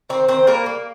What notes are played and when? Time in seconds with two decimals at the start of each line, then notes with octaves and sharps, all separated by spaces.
0.09 D#3 C4 C5
0.28 D#3 C4 C5
0.47 G3 A#3 A#4
0.66 A#3